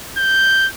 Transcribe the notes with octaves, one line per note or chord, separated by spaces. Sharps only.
G6